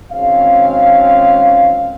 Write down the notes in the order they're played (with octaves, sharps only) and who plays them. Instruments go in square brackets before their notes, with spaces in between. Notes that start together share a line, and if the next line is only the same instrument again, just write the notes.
[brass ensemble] G#1 G#3 C4 C#4 F5